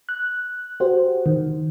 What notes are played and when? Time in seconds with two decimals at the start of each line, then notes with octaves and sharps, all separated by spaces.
0.09 F#6
0.80 F#4 G4 C5
1.26 D#3